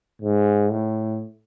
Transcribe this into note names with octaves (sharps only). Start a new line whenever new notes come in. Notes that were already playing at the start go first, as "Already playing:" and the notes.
G#2
A2